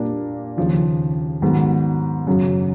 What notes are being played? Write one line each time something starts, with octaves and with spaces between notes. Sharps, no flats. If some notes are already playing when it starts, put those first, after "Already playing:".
Already playing: A#2 G3 A#3 D4
D#2 C#3 F3
G#2 D#3 F#3 B3
F#2 C#3 F#3